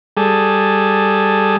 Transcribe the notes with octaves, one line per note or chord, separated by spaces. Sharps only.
G3 G#4 A4